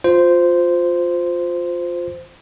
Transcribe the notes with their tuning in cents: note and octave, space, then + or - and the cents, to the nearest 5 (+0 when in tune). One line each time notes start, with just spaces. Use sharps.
F4 +15 C5 -10